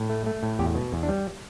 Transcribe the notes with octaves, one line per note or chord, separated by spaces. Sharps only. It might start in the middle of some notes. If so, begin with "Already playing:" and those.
Already playing: A2
A3
A3
A2
E2 G4
B2
E2
D4
G3